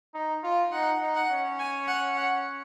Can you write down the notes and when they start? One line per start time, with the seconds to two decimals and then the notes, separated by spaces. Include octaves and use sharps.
0.14 D#4
0.43 F4
0.72 D#4 F#5
1.01 D#4
1.15 F#5
1.30 C#4
1.59 G#5
1.88 F#5
2.17 F#5